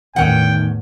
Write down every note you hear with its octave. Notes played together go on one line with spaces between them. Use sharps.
E2 A2 D#3 C#4 F#5 G5